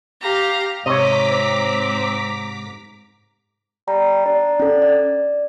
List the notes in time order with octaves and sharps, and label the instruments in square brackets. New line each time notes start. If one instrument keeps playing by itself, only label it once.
[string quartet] G4 F5 A#5
[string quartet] G#2 [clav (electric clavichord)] C3 C#5 [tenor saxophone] D#5 [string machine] A#5 D6 B6
[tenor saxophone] C4
[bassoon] G3 [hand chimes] A#5
[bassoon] D4
[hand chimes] C#4 A4
D5